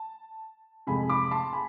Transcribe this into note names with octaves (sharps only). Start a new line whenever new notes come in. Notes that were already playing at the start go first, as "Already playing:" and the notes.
Already playing: A5
F2 C3 G#3 G#5 B5
B5 D6
A5 C6
G#5 B5